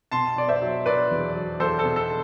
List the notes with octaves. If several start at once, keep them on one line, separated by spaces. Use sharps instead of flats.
B2 A5 C6
B2 D5
C5 E5
F#3
F#3 B4 D5
E2
F#3
E2 A4 C5
A4
B2
A4